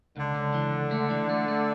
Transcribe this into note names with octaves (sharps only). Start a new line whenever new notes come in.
C#2 D3
C#2
E3
C#2
A3
E3
A3
A3